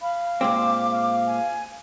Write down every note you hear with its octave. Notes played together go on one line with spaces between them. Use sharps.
F5 B5
A#2 G#3 C4 D6
F5
G#5